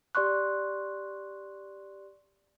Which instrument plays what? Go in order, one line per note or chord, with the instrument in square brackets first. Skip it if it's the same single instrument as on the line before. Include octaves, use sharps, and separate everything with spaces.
[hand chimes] G4 D5 C6 C#6 F#6